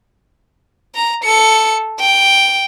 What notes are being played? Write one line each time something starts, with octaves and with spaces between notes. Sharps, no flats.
A#5
A4 C#7
G5